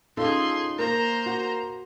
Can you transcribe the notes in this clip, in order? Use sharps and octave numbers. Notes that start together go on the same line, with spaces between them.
C#4 D#4 F4 G#4 A4 C6
A#3 C5 A#5
F#4